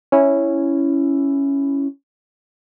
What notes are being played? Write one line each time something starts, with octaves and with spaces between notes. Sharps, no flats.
C#4 E4